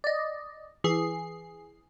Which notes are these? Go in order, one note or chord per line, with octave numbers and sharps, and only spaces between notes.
D5 D#5
E3 G#4 C7